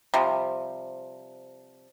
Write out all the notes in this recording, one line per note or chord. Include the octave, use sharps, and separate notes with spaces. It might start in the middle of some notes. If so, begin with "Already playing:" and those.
C3 F3 G3